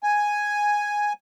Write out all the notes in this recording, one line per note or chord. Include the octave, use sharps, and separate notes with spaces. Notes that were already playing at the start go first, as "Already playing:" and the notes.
G#5